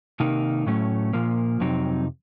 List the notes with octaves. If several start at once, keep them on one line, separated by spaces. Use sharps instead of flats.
C3 D#3 A#3 D#4
A2 F#3 A3 C#4
A#2 F3 A#3
F2 C3 F#3 C4 D#4